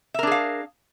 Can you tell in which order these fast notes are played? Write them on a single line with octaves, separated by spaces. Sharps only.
E5 A#4 D4 G#4 F5